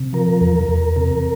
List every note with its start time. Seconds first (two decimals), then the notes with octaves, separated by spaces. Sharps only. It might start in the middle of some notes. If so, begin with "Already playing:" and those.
Already playing: C3
0.13 F3 A#4
0.41 E2
0.69 E2
0.96 C3